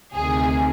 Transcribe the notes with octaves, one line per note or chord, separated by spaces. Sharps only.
D2 C3 D#3 G#4